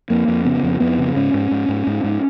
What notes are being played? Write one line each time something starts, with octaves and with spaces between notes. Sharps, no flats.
F2 A#3
F2
C#3 B3
F2
F2 B3
C#3
G#2 C#4
G#2
G#2
G#2
G#2
G#2